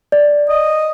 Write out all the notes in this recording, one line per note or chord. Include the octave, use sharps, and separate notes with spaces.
D5
D#5